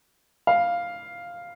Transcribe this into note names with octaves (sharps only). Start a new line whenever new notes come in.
F5